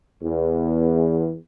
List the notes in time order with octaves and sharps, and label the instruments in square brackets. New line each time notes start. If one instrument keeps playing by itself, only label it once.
[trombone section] E2